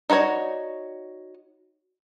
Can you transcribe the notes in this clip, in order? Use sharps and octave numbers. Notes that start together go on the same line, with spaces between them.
D#4 F#4 B4 C#5 D5